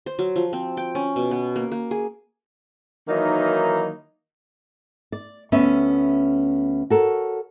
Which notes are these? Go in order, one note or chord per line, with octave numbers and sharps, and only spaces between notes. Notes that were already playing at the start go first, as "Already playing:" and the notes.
C5
F#3
F3
C4
G5
C#4
B2
B3
A#3
A#3
G#4
D#3 E3 F#3 A#3 D#4
D5
D2 B3 C#4 C5 E5
F#4 A4 A#4 C#5